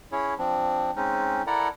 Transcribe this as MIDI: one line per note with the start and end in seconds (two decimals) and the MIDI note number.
0.12 0.34 61
0.12 0.34 64
0.12 0.34 68
0.12 0.34 73
0.39 0.91 53
0.39 0.91 60
0.39 0.91 62
0.96 1.42 56
0.96 1.42 60
0.96 1.42 61
0.96 1.42 63
1.47 1.68 64
1.47 1.68 69
1.47 1.68 70
1.47 1.68 74
1.47 1.68 78
1.47 1.68 82